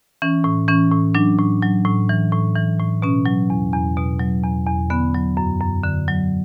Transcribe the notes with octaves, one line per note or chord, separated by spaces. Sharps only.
E3 C#4
A2
E3 C#4
A2
F#3 D4
A2
F#3
A2
E3
A2
E3
A2
B2 C#4
F#3
E2
E2
B2
F#3
E2
E2
D3 B3
F#3
F#2
F#2
D3
F#3